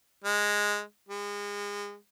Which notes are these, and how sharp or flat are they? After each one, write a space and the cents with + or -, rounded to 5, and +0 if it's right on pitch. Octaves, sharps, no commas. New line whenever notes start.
G#3 -5
G#3 -30